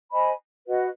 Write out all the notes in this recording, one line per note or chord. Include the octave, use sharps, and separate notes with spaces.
C5 D#5 G#5 B5
F#4 B4 D#5 F#5